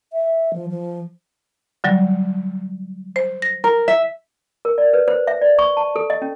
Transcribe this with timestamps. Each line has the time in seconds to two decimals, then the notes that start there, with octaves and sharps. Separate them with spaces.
0.13 E5
0.53 F3
0.70 F3
1.84 D3 F#3 G3
3.16 C5
3.42 A#6
3.64 A#4
3.88 E5
4.65 A#4
4.78 D5
4.93 B4
5.08 C5
5.27 E5
5.41 D5
5.59 C#6
5.77 A5
5.96 A4
6.10 D#5
6.22 C#4